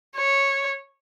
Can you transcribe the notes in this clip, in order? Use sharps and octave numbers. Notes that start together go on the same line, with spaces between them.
C#5